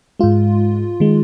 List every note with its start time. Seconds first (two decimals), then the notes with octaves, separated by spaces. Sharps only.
0.19 G#2 G#3 F4
1.00 D#3 G#3